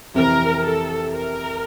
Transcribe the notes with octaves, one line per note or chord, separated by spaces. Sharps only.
F2 C3 E3 A#4
A4
A#4